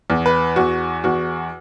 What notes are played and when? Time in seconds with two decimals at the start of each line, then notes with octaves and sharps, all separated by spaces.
0.10 E2
0.26 B4
0.56 E2 F#4
1.04 E2 F#4